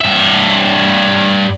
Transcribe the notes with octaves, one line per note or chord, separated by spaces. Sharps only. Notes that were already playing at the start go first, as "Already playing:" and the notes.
G2 E5